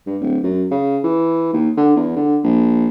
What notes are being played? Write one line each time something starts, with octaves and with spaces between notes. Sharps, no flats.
G2
D1
F#2
C#3
E3
D#2
D3
E2
D3
A#1